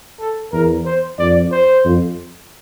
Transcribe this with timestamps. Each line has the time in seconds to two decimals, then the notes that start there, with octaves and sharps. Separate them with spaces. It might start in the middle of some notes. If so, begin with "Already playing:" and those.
0.20 A4
0.52 E2 A#4
0.86 C5
1.18 F2 D5
1.52 C5
1.85 F2